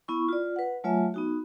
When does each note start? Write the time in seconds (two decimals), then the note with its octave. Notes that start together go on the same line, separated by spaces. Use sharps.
0.08 B3 E4 C#6
0.29 F4 D5
0.56 B4 F#5
0.84 F#3 A3 F4 C#5 E5 G#5
1.14 B3 D#4 F#4